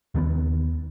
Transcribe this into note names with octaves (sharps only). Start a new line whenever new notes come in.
D#2 D#3 A#3 B3